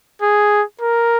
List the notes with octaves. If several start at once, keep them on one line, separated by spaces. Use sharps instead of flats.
G#4
A#4